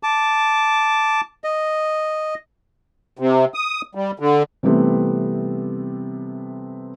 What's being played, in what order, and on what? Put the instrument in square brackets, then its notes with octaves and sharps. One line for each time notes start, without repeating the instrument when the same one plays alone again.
[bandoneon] A5 D6
D#5
[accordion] C3
D#6
G3
D3
[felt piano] C3 E3 G3 A3 B3 C4